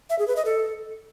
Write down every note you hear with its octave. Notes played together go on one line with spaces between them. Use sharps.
E5
G#4
B4
D#5
A4